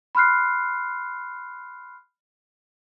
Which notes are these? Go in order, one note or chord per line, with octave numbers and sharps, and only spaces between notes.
B5 C6 F6 F#6 C7